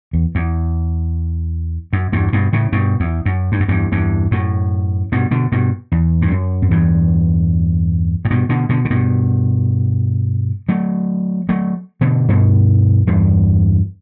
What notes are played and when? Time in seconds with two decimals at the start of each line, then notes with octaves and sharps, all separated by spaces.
0.13 E2
0.35 E2
1.93 F#2
2.12 E2 G2
2.33 G2 B2
2.53 A2 C#3
2.72 G2 B2
3.00 E2
3.26 F#2
3.52 G2
3.60 F#2
3.68 E2 G2
3.92 E2 G2
4.31 F#2 A2
5.12 G2 B2
5.31 B2 D3
5.52 G2 B2
5.92 E2
6.22 G2
6.32 F#2
6.62 F#2
6.71 E2 G2
8.25 A2
8.30 G2 B2
8.49 B2 D3
8.69 B2 D3
8.85 C#3
8.90 G2 B2
10.69 F#3 A3
11.49 F#3 A3
12.01 B2 D3
12.28 G2 B2
13.07 E2 G2